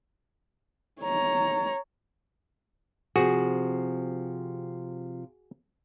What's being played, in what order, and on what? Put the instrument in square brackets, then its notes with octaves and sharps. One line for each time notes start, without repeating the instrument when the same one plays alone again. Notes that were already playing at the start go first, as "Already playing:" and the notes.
[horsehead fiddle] C#5 A#5
[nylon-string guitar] C3 F3 [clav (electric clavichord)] F#4 G#4